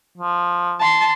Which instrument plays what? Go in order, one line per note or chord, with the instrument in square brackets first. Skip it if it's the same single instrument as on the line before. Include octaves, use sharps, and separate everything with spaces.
[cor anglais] F3
[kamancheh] A5 C6